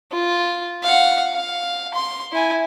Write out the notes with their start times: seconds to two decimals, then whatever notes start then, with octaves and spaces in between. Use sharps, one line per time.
0.12 F4
0.83 F5 F#5
1.33 F5
1.94 C6
2.32 E4 G#5